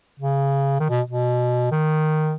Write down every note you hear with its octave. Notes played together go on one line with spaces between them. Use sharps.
C#3
D#3
B2
B2
D#3